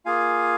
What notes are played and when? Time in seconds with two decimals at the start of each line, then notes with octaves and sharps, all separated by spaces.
0.06 A#3 F4 G#4 F5 G#5